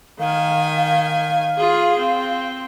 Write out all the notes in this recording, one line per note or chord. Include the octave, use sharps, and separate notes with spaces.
D#3 F5 G#5
F4 G#4
C4